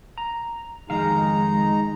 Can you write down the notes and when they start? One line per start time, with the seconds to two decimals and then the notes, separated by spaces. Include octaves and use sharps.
0.18 A#5
0.90 F2 D#3 G#3 D#4 F5 A#5